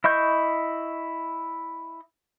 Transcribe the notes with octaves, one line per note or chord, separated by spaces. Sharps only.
E4 D#5 C#6 G6